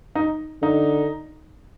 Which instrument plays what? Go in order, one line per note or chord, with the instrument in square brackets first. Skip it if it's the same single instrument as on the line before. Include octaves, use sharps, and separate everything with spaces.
[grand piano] D#4
[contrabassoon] D3 [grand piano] D#4